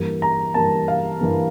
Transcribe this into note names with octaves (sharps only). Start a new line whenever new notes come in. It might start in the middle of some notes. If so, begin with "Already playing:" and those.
Already playing: G2 E3 G3 A#3
A#5
G2 E3 G3 A#3 A5
F5
G2 E3 G3 A#3